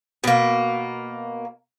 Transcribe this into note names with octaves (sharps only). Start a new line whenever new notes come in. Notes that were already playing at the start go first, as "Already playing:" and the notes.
B2 A#3